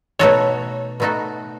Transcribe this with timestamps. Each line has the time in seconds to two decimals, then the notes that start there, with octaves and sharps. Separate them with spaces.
0.19 B2 A3 D#4 F#4 A4 C#5
1.00 B2 A3 D#4 F#4 A4